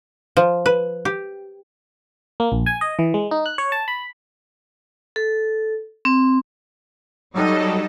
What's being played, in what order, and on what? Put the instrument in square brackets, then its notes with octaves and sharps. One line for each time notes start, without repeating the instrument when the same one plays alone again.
[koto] F3
B4
G4
[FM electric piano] A#3
A#1
G#5
D#5
E3
G#3
D#4
F#6
C#5
A5
B5
[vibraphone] A4
C4
[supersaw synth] F#3 G3 A4 [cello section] D#4 D#5